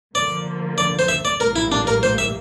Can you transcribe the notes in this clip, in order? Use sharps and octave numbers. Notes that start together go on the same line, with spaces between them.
D3 F3 A#3 D5
D5
C5
E5
D5
A#1 A2 G3 A#3 A#4
E4
D4
A#4
C5
E5